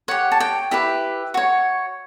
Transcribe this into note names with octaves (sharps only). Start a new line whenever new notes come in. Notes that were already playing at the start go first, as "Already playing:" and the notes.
G4 C#5 F#5
A5
G5
E4 G4 B4 E5
F#4 C#5